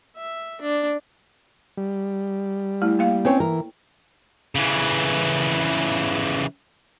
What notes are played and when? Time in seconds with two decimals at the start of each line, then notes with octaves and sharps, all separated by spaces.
0.16 E5
0.61 D4
1.77 G3
2.82 A3 E4
2.99 A#3 F5
3.25 C4 C#4 B4 C#5 G5
3.40 E3 A#4
4.55 C#3 E3